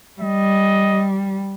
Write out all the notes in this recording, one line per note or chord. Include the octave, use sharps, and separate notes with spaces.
G3 D#5